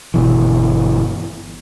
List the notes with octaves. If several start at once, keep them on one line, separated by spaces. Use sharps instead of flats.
G1 B2 E3